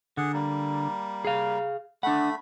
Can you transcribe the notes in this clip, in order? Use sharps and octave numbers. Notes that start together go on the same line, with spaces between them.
D3 G#4 F#5
G3 A#3
G#4 F5
A3 D4 F#5 B5